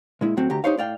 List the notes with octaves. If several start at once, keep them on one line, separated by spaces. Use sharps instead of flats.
A#2 G#3 E4
A2 F#3 C4 F#4
D2 G4 A#5
D#4 F4 G4 C5 C#5 F5
A2 D5 F5 G5